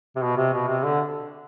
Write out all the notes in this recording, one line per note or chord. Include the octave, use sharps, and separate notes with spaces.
C3
B2
C3
B2
C3
D3